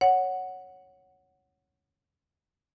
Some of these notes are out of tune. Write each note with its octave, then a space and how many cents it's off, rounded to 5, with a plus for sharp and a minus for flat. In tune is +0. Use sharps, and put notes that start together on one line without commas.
C#5 +0 F#5 +0